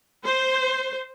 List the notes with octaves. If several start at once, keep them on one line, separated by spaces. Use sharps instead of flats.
C5